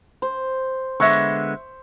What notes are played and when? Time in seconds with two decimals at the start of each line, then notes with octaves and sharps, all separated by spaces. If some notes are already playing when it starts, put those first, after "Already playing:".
0.22 C5
1.00 D3 G#3 B3 E5 C#6